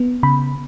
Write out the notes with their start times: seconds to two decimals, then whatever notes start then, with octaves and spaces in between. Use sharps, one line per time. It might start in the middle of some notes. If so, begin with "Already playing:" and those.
Already playing: B3
0.23 C#3 B5